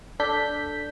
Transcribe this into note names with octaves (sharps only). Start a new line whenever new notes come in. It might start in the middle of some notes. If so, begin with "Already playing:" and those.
D4 A4 G6 B6